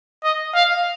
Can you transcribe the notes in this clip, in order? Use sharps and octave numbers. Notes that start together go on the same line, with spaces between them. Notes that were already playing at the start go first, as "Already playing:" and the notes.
D#5
F5